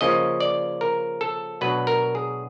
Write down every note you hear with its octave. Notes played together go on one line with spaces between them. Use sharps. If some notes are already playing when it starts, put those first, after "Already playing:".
C#3 F3 A#3 C#4 D#5
D5
A#4
A4
B2 F#3 A3 D4 B4
A#4
G#4